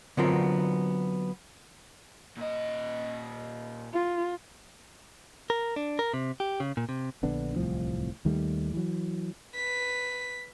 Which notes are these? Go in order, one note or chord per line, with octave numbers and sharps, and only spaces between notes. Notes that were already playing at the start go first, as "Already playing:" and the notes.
D3 F#3 B3 C4 F4 A#4
A#2 D#5
F4
A#4
D4
A#4
C3
G4
C#3
A#2
C3
A#1 D3 B3 D4
D1 C2 A2 F3
D#2 D#3 G3 A3
E3 F#3
B4 B6